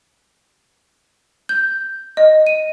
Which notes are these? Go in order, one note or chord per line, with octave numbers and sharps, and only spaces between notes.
G6
D#5
D#7